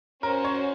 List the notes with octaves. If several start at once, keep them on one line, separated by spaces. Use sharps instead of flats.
C#4 F#4 A#4 C5
C#5